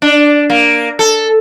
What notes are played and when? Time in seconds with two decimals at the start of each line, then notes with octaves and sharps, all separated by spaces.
0.02 D4
0.50 A#3
0.99 A4